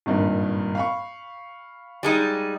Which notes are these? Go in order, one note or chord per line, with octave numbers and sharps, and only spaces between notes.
G#1 G2 A#2
F5 B5 C#6
G3 G#3 D#4